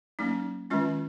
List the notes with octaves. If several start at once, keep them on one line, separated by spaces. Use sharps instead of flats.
F#3 A#3 C#4 D#4
D#3 G#3 C#4 F4